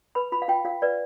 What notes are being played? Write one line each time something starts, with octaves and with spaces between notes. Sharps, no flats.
B4 B5
F4 B5
F5
F4 G5
F4 F5
B4 D5